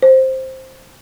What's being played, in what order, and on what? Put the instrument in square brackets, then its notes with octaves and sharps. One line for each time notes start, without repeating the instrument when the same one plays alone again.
[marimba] C5